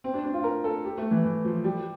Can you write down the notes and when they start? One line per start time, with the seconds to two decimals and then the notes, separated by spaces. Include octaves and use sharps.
0.04 C4
0.14 D4
0.24 D4
0.34 F4
0.44 A#4
0.64 A4
0.84 G4
0.98 A3
1.11 E3
1.24 E3
1.45 F3
1.64 G3